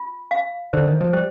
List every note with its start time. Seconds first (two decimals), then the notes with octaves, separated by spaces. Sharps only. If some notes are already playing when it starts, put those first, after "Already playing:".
Already playing: F4
0.31 F5
0.73 D3 C5
0.87 D#3
1.01 F3
1.13 G3 C5